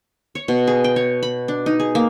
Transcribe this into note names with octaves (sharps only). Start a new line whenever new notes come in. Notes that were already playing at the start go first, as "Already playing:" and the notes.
C#5
B2
G#4
G5
C#5
B5
D4
D#4
G#4
A#3